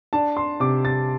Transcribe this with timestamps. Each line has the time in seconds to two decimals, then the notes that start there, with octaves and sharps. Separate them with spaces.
0.13 D4 A5
0.37 C6
0.60 C3 D6
0.85 A6